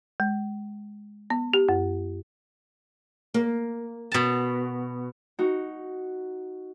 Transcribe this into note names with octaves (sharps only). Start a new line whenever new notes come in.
G#3
B3
G4
F#2
A#3
B2 A5
D#4 F#4